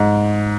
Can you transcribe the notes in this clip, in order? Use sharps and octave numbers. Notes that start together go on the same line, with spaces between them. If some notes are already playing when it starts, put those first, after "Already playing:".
Already playing: G#2